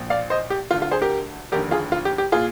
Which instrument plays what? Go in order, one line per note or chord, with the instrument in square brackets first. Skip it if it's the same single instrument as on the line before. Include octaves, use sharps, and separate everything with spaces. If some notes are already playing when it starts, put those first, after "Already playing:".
Already playing: [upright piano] A#1 A#2
D5 F5
C5 D#5
G4
D2 D3 F4
F4
G#4 C5
G4 A#4
F1 D#2 D3 G4 A#4
F4 G#4
F4
G4
G4
A#2 F4 G#4